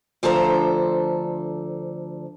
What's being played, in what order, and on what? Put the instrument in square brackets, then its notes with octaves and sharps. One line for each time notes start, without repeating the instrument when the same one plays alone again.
[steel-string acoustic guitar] D2 F3 D4 A4 C5 A#5